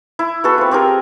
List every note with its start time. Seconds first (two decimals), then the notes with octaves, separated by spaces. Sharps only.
0.19 E4
0.44 B3 F#4 G#4 A4
0.58 C4 F4
0.71 C4 G4 G#4 A#4